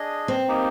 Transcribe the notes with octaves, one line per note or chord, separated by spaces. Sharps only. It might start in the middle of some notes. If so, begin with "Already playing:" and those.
Already playing: D4 G#4 D#5
C4
A#3 D#4 G4